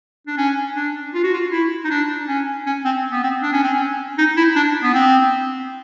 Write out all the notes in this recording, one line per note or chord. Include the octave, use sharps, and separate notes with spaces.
D4
C#4
D4
F4
F#4
F4
E4
D#4
D4
C#4
C#4
C4
B3
C4
D4
C#4
C4
C#4
D#4
E4
D4
B3
C4